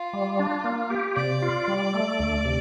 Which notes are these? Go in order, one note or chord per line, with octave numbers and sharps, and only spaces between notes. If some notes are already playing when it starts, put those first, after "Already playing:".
Already playing: F4
G3
D4
A#3
G4
C3 D5
F4
G3
A3
D2
C3